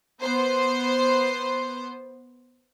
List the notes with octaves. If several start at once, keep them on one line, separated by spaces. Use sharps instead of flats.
B3 C5